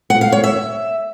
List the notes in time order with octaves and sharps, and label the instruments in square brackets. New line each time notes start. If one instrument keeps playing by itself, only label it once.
[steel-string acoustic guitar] F#5
F5
C#5
E5